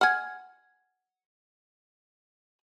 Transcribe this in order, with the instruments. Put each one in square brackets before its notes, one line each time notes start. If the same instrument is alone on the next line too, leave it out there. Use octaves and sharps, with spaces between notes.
[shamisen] F#5 G#5 [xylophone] F6 G#6